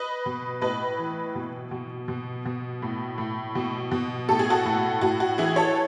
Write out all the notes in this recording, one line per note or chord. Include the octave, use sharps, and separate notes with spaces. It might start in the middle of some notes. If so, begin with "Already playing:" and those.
Already playing: B4 D#5
B2
A2 B4 D#5
E3
B2
B2
B2
B2
A2
A2
B2
B2
A2 A4
G#4
F#4 A4
A2
A2 F#4
F#4
E3 E4 G#4
A4 C#5